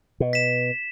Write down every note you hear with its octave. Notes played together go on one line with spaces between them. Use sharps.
B2
B6 E7